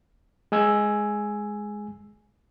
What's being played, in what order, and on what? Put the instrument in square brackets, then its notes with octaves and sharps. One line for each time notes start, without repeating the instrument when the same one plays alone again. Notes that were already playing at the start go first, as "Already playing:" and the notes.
[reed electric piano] G#3 G#5 E6 G#6